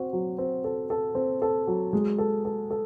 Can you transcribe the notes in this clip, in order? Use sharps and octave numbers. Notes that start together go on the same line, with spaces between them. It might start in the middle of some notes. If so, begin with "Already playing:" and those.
Already playing: C4 F#4
F#3
C4
A4
A4
C4
A4
F#3
G#3
A4
A4
A4